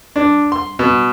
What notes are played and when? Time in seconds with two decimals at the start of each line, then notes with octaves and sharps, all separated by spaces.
0.16 D4
0.52 C6
0.79 B2